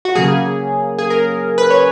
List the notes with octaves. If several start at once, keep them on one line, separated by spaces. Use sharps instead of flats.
F#4
C#3 F#3 A#3 G#4
G#4
A#4
B4
C#5